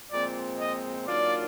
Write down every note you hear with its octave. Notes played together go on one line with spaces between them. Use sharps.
A#2 F3 G#3 C4 D5
D#5
D#3 F#3 A#3 D4 F4 D5